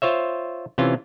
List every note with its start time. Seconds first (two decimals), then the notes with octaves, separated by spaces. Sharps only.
0.02 F4 C5 C#5 E5
0.78 C3 E3 C#4 F4